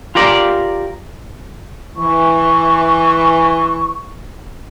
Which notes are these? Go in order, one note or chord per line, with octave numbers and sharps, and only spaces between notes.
F4 G4 A#4 D5
E3 C#6